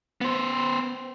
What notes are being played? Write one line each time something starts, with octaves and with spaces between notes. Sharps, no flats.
B3 C5